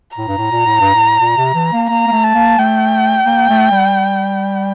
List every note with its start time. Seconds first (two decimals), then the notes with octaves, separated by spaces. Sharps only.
0.17 A2 A#5
0.28 G2
0.38 A2
0.52 A#2
0.66 A2
0.81 G2
0.94 A2
1.20 A#2
1.37 C3
1.54 E3
1.73 A#3
1.89 A#3 A#5
2.07 A#3
2.12 A3
2.23 A5
2.35 A#3
2.58 A3 G5
3.26 A#3
3.49 A3
3.71 G3